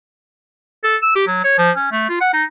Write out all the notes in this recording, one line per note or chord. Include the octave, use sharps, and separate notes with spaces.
A4
E6
G4
F#3
C#5
F3
C#4
A3
F4
F#5
D#4